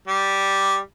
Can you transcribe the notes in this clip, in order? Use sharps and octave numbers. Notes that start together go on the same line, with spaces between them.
G3